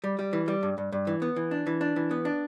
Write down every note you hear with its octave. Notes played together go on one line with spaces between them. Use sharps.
G3
G3
E3
G3
G2
G2
G2
E3
B3
E3
D4
E3
D4
E3
B3
D4